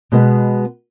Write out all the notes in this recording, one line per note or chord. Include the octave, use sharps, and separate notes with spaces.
B2 G#3 B3